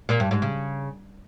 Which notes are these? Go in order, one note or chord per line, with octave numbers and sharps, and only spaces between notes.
A#2
G2
G#2
C#3